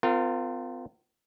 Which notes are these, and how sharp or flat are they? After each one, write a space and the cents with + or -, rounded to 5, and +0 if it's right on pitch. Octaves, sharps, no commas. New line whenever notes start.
C4 -45 F4 +0 A#4 -30